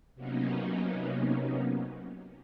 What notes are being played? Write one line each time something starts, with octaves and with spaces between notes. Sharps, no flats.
C3 F#3 A#3 B3 C#4 D#4